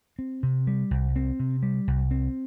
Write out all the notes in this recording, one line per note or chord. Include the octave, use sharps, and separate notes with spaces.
C4
C3
G3
C2
C4
C3
G3
C2
C4